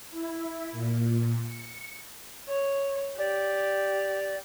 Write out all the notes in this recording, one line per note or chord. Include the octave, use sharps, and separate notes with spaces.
E4
A#2
C#7
C#5
G4 D5